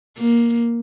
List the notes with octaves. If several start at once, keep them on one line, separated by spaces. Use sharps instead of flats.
A#3